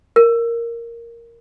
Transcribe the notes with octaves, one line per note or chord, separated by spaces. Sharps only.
A#4